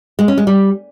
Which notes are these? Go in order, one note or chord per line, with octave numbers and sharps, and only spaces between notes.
G#3
C#4
G#3
G3